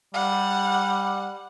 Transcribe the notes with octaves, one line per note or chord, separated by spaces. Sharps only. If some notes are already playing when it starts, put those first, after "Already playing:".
G3 F#5